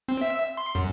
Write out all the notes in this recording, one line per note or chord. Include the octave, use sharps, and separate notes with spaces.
C4
E5
C6
F#2